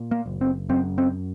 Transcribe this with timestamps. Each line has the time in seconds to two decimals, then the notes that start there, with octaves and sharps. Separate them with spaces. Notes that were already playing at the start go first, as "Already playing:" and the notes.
Already playing: A#2
0.11 A#3
0.26 F#1
0.41 C4
0.69 F#2 C4
0.98 C4